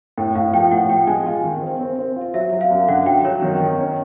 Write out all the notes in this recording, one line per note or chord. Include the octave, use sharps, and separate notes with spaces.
A2 G5
A2 F5
F3 G5
A2 F#5
F3 G5
G#3 G#5
F4
D#3
C4
C4
C4
F4
F#3 E5
F#3
F5
F#2
D3 F#5
F#3 G5
F#3 C#5
D#3
D#3
C#4